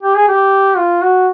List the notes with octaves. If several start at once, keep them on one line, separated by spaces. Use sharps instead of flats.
G4
G#4
G4
F4
F#4